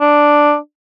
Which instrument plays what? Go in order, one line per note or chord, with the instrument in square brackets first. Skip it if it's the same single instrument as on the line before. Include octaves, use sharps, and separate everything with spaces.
[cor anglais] D4